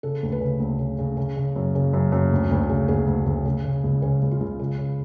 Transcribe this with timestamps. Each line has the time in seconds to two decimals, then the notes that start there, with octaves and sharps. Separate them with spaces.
0.03 C#3 A4
0.23 D2
0.32 B4
0.41 C#3
0.60 D2
0.79 C#3
0.99 C#3
1.17 C#3
1.37 C#3
1.56 F#2
1.75 C#3
1.93 F#2
2.12 F#2
2.32 D2
2.51 D2
2.69 C#3
2.88 D2 G#4
3.07 D2
3.26 D2
3.46 C#3
3.64 C#3
3.83 C#2
4.02 C#3 C#4
4.22 C#2
4.31 F4
4.40 C#2
4.60 C#3
4.78 C#3